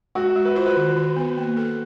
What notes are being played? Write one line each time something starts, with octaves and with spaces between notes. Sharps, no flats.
G#3 F#4
G#3
B4
F4 C5
B4
D#3
D#3
B3
A#3
A4